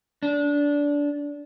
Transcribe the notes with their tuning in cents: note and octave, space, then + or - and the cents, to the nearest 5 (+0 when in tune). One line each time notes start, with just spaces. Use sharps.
D4 -20